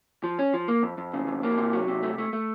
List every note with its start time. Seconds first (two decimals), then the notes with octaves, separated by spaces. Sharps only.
0.24 F3
0.39 C#4
0.54 F3
0.68 A#3
0.83 F2
0.98 F2
1.14 C#3
1.28 F2
1.43 A#3
1.58 C3
1.73 F#3
1.88 C3
2.03 A3
2.18 A3
2.33 A3